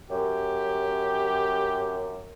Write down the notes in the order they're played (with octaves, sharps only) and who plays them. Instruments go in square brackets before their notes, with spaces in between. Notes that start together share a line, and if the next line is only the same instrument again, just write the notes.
[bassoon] F#2 [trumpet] G4